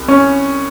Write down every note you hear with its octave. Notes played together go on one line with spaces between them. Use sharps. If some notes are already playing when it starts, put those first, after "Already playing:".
Already playing: C2
C#4